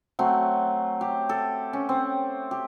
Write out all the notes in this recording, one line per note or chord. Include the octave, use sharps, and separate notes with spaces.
F#3 A3 C4
G4
A4
C#4
C4
G4